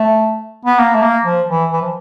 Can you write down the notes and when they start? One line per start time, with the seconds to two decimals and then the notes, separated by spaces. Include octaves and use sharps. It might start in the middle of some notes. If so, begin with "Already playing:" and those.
Already playing: A3
0.65 B3
0.78 A#3
0.95 A3
1.02 A#3
1.25 F3
1.49 E3
1.72 E3
1.81 F3